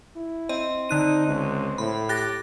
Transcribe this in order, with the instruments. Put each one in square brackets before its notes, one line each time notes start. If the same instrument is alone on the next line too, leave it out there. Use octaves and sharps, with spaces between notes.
[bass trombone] E4
[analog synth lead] C4 [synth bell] D#5
[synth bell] D3 F#6 D#7 [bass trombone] D#4
[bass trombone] C#2
[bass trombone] A2 [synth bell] B5
[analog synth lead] G4 [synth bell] F#6 A6 A#6